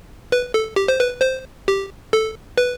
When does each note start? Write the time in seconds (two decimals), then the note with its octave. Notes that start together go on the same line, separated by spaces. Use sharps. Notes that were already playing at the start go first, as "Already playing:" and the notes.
0.32 B4
0.54 A4
0.76 G4
0.88 C5
1.00 B4
1.22 C5
1.68 G4
2.13 A4
2.58 B4